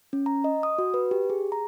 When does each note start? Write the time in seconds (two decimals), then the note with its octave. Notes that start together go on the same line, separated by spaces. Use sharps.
0.13 C#4
0.26 A#5
0.44 D#5
0.63 D#6
0.78 F#4
0.94 B4
1.11 G4
1.30 G#4
1.52 A#5